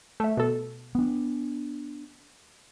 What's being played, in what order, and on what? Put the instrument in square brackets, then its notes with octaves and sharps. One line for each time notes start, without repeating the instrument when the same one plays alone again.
[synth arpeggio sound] A3 E5
B2 A4
[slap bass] B3 D4